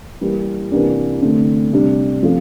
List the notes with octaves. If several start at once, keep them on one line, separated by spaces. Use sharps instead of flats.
E3 G3 A#3
C3 E3 A#3 D4 G4
D3 A3 C4
C3 G3 D4
F3 C4 F4 A4